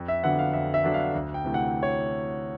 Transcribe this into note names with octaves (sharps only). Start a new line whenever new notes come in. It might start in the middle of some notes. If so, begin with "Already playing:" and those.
Already playing: F2
E5
D3 F#3 B3 D4 F#5
F5
F2 E5
E5
D3 F#3 B3 D4
F5
D2
G5
C3 E3 A3
F#5
C#5